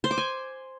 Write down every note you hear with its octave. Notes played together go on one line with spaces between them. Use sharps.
C5
D6
G#5